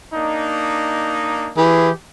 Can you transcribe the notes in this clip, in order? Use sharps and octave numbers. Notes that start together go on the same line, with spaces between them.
A#3 D4 D#4
E3 G4 G#4